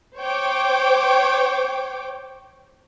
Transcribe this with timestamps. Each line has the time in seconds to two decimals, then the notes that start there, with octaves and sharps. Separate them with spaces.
0.18 C5 C#5 G5 D6